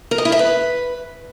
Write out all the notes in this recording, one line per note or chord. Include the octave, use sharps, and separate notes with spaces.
A#4
D#5
E4
E5
B4